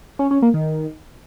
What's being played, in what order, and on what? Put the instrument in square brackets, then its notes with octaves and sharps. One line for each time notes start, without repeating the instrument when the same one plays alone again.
[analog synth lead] C#4
C#4
A#3
D#3